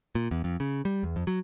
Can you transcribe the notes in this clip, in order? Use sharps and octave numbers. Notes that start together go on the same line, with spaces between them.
A#2
E2
F2
C#3
G3
E2
F2
F#3